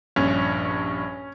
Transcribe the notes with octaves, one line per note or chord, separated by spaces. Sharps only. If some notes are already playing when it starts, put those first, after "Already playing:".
A#1 G2 C#4 C#6